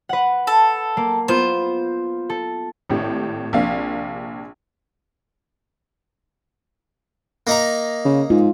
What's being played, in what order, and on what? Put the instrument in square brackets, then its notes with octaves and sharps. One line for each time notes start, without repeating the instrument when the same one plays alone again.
[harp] B4 F#5
[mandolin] A4
[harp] A#3
[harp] B3 F4 [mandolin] C5
[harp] A4
[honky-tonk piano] G#1 A2 G4
A#1 C3 A#3 F5
[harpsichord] A#3 D#4 A#5
[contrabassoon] C#3
[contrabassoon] G#2 [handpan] F4